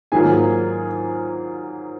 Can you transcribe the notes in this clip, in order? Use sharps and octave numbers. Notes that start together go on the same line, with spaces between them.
G#2 D#3 F#3 A#3 F4 G#4 G#5